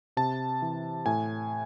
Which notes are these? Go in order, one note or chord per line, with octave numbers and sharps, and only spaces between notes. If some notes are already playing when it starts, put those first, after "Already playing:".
C3 A5
E3
A2 G#5